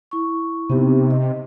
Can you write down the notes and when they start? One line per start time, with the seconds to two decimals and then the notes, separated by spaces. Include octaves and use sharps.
0.11 E4 C#6
0.70 C3 B3 D#4 G4
1.11 D#5